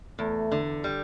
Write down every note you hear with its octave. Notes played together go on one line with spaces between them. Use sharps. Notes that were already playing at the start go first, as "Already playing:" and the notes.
E2 A3
D3
G3